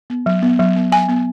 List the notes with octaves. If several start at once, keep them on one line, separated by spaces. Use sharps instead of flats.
B3
F#3
B3
F#3
B3
F#3 G#5
B3